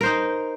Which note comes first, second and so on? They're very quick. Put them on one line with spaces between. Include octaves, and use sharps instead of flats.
A#4 C5 D#4